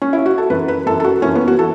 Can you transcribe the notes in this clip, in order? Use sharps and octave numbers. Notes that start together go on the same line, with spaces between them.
C#4
E4
F#4
A4
F#2 E3 B4
B4
F#2 E3 A4
A4
F#4
F#2 E3 C#4
B3
F#4
E3 A4